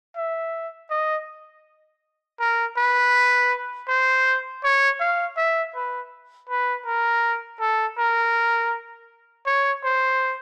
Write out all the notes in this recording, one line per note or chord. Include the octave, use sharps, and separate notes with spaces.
E5
D#5
A#4
B4
C5
C#5
F5
E5
B4
B4
A#4
A4
A#4
C#5
C5